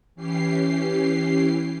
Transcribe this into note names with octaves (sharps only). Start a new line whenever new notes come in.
E3 C#4 G4 C7